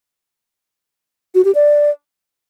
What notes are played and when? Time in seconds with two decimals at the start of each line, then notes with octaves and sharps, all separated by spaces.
1.35 F#4
1.45 G4
1.55 D5